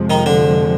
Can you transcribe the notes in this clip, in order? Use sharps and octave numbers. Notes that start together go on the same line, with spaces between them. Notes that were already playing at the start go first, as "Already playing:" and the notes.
Already playing: F2 C3 F3 G#3
D#3 D#4
D3 D4